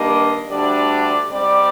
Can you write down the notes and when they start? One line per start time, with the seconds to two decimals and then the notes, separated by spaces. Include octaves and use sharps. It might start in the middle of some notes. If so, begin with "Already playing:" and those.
Already playing: G2 D#3 G3 A#3 D4 D#5
0.49 D2 D3 G3 D4 D5
1.30 G#2 G3 C4 D5